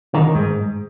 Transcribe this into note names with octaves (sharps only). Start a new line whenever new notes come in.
D#3
D#3
G#2